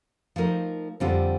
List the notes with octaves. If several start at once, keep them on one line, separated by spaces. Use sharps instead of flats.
F3 A3 D#4 A#4
F2 D3 G3 C4 F4